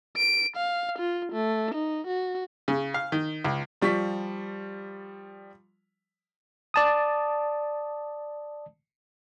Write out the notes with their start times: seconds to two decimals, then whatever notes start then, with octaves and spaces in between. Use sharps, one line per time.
0.17 D7
0.57 F5
0.99 F4
1.33 A3
1.75 D#4
2.08 F#4
2.68 C#3
2.94 F5
3.12 D#3
3.44 C#2
3.82 F3 G3 C#6 B6
6.74 D5 A5 D#6